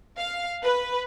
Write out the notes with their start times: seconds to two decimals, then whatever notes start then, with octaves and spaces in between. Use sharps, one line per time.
0.18 F5
0.64 B4